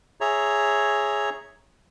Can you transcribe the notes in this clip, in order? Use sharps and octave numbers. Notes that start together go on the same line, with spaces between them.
G#4 C#5 E5 A#5